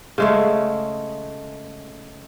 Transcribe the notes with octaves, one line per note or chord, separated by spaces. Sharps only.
C#3 G#3 A3